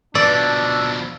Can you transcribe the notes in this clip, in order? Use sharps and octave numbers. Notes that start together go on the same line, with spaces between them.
B2 F3 D4 D5 E6